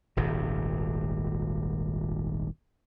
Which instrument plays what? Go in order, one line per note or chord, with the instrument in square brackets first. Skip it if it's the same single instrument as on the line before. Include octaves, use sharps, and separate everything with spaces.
[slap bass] D#1 G#1 C3